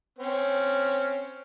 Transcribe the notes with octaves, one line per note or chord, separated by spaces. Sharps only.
C4 C#4